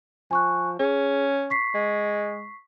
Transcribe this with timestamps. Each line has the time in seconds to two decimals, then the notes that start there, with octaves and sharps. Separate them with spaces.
0.31 F3 G#5 C#6 F#6
0.80 C#4 G#4
1.50 C#6 B6 C7
1.75 G#3